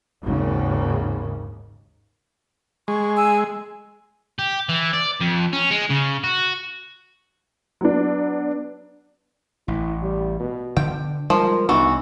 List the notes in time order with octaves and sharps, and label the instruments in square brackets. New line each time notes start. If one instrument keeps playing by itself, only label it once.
[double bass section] G#1 D#2 G#2 C#3
[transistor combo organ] G#3 [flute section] C#6
[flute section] G#5 E6
[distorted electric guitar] G4
E3
D5
F2
C#4
G#3
C#3
F#4
[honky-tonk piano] F#3 B3 D4
[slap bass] A1 [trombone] E4
[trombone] G3
B2
[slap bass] D3 [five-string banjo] G5
[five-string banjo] F3 [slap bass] G3 G#3 [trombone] A#4
[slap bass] C2 B3 D4 [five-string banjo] E3 F#4 [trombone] D#4